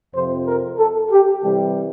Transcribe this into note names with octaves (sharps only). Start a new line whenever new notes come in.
F2 C3 F3 C5
A#4
A4
G4
C3 E3 G3 G4